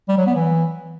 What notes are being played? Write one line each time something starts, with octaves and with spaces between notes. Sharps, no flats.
G3
F#3
B3
E3